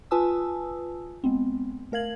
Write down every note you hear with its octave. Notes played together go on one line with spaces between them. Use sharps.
F4 B4 G#5 A5 D#6 E6
G#3 B3 C4
A3 A#4 F5 G#6 F#7